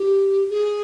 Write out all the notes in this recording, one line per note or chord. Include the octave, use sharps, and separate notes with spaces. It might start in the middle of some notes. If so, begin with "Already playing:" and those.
Already playing: G4
G#4